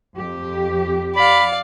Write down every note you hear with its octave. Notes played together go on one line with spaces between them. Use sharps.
F2 G4
D5 F5 B5